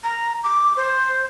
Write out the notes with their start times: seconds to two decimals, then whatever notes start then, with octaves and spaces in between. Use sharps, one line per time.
0.04 A#5
0.44 D6
0.77 C5